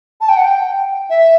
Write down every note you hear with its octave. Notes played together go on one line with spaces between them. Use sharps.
A5
G5
F#5
G5
E5